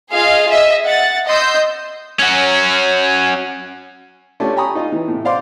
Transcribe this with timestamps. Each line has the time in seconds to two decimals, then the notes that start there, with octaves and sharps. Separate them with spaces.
0.12 F4 G#4 D#5 F5 G#5
0.50 D#5 E5
0.85 F#5 A6
1.26 D#5 C6 E6 G6
2.19 C#4 F#4
4.40 A3 C#4 D4 F4 G4
4.56 G5 G#5 A#5 B5 C#6 D#6
4.75 D#4 F4 D#5
4.92 E3
5.08 A2 C3
5.25 C5 D5 F5 F#5 C6 D6